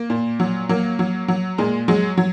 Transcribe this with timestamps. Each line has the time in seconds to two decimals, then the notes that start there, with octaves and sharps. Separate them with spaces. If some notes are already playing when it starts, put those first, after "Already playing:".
Already playing: A#3
0.10 A#2
0.40 F#3
0.69 F#3 A#3
0.99 F#3
1.28 F#3
1.58 A#2 G#3
1.88 F#3 G#3
2.18 F#3